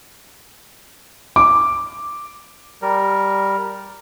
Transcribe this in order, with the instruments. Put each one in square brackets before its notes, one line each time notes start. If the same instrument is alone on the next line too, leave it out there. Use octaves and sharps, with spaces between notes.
[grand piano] D6
[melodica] G3 A#4